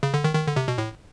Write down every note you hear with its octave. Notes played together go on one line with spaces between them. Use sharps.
C#3
D3
D#3
D#3
D3
C3
B2
A2